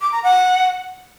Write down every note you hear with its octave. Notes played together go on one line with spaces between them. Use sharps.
D6
A#5
F#5